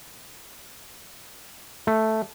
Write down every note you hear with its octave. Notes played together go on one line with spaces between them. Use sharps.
A3